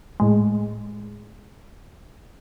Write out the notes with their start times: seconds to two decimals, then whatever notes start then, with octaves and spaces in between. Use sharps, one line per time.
0.20 A2 G#3